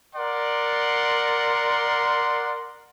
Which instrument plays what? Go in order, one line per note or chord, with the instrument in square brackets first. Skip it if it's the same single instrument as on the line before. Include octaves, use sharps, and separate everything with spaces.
[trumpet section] A#4 D5 F#5 C6